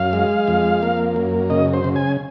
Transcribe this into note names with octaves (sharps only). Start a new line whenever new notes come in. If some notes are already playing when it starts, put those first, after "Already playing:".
Already playing: F#2 F5
G#3
F2
A#3
F#2
C#3 D#5
C5
C#3
G#5